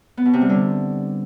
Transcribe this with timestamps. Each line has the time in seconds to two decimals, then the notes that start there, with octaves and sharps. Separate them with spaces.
0.17 B3
0.25 B2
0.33 C3
0.41 G3
0.49 D3